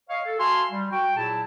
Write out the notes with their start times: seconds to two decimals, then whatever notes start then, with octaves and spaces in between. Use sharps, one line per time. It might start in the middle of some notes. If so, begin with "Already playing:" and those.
0.08 C#5 D#5 F5
0.25 A4
0.38 F#4 E5 F5 G#5 A5 C6
0.71 G3
0.91 F#4 G5
1.16 A#2 F#3 E4 G#4 A5